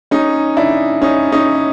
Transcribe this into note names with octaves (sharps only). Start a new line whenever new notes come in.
C#4 D#4
D4 E4
C#4 D#4
C#4 D#4